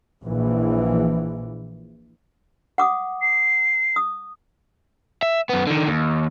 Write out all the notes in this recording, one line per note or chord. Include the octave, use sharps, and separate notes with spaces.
A#1 E3
F#5 D6 D#6
C7
D#6
E5
F#2 B3
D3 D#3
D#2